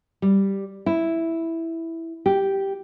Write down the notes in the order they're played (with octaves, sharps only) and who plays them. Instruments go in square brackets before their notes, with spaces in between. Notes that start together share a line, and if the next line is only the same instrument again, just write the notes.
[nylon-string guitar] G3
E4
G4